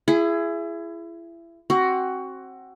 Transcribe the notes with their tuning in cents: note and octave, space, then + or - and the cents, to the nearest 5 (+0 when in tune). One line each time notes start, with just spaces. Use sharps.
E4 +30 G#4 +5
C4 +30 F#4 +15